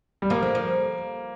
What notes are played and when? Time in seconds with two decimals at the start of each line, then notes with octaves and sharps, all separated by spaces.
0.22 G3
0.30 F3 A#3
0.42 D3
0.55 F3